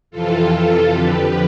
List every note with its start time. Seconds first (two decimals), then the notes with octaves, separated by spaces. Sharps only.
0.11 F2 C3 E3 F4 A4
0.92 F2 D3 F3 G4 B4